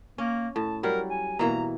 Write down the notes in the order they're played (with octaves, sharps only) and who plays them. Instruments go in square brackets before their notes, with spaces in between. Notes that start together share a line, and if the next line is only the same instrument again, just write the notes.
[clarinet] A#3 [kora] C#4
[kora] A2 [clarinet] A5
[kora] F#3 G3 [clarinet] A#4
[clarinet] G#5
[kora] B2 E3 A#3 [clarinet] A#5